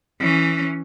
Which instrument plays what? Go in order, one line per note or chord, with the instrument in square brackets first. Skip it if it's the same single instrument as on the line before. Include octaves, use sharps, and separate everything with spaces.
[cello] E3 C#4